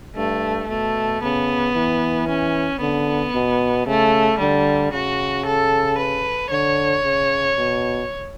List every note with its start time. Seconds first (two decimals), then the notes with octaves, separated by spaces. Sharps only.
0.16 G2 A3
0.69 B2 A3
1.22 C#3 B3
1.75 E3
2.28 C#4
2.80 D3 B3
3.34 B2
3.87 C#3 A3
4.39 D3 G3
4.92 C#3 F#4
5.46 A4
5.98 B4
6.51 D3 C#5
7.05 C#3
7.58 B2